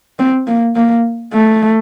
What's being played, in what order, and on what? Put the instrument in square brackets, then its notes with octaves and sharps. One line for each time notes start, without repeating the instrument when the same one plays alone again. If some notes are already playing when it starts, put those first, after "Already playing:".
[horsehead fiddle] C4
A#3
A#3
A3